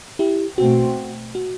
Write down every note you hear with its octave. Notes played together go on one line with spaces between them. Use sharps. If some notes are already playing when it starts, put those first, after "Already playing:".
E4 G4
B2 A3 C4 F#4
F#4